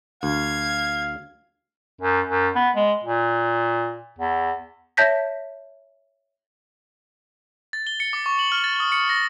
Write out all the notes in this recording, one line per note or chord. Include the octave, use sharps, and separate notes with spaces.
D2 F5 G#6
F#2
F#2
B3
G#3
A#2
E2
C#5 E5 A5 G6 A#6 B6
A6
G7
C#7
D6
C#6
F#7
F6
A6
D#6
C#7
A#6